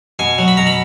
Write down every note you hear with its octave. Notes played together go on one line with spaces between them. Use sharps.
B2 G#5
F#3
B5
B2 A#5
B5